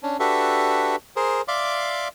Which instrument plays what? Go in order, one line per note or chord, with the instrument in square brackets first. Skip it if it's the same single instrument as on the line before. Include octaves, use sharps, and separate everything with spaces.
[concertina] C#4 D4
D4 F#4 G4 A4 B4 E5
G#4 A#4 C5
D5 E5 F5 C6 D6